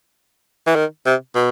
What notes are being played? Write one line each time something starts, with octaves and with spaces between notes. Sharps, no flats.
E3
D#3
C3
B2